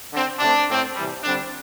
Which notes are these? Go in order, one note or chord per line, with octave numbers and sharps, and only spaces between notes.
D3 C4
C3 A3 C4 D4
A2 A3 C4
C3 E3 G3
D3 G3 C4 D4